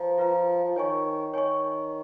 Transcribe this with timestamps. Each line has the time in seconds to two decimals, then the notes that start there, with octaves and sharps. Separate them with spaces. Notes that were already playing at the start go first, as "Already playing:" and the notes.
Already playing: F3 F4 B4 F5 A#5
0.18 F4 B4 F5 A#5
0.65 F3
0.76 D#3 C#5 G#5 C#6
1.33 D#3 C#5 G#5 C#6